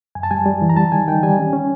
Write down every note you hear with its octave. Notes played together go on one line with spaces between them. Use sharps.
F#2 G#5
A5
G3 G#5
G3
E3
A#5
G3 A5
D#3 G#5
D#3 G5
G3 G#5
C#4
C#4